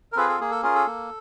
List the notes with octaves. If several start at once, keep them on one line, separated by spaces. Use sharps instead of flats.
A#4
C4 F4 G#4 A4 B4
A4
A#3 G#4
A4
C#4 F4 G#4 A#4
A4
A#3